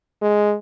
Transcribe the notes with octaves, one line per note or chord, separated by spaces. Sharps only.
G#3